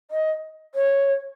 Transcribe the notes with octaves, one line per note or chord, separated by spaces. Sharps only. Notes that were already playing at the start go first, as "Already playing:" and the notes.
D#5
C#5